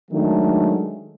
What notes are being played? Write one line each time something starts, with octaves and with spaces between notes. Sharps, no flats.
D#3 F#3 G#3 A3 D4